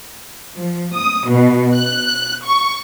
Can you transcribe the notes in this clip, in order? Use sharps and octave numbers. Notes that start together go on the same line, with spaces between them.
F3
D#6
B2
F#6
C#6